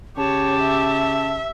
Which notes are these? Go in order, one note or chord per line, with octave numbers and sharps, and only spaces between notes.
C#3 G4 C#5 A5
E5